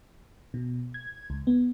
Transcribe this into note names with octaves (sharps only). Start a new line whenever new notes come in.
B2
G#6
C#2
B3